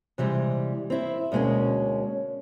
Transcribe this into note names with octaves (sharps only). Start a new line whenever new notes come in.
C3 E3 G3 G#3
C4 E4
D2 B2 G#3 A#3 C#4